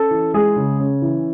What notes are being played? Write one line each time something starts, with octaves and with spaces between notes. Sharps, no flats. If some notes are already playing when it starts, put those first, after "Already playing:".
Already playing: C#4 A4
E3
G#3 G#4
C#3
C#4
E3